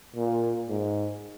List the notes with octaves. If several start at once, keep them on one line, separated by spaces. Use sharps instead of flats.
A#2
G#2